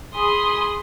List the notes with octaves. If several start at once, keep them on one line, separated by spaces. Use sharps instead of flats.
G#4 B5 C6 D#6